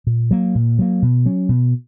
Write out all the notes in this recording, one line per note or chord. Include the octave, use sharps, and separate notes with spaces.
A#2
F#3 A#3
A#2
F#3 A#3
B2
F#3 C#4
B2